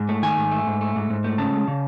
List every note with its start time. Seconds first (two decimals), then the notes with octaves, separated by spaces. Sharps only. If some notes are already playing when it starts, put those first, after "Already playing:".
Already playing: G#2
0.09 A3
0.23 D#3 G#5
0.37 G#2
0.51 A3
0.67 G#2
0.81 A3
0.96 G#2
1.10 G#2
1.24 A3
1.38 C#3 A5
1.52 G#3
1.68 C#3